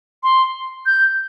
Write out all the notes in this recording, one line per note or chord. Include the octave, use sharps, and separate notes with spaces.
C6
G6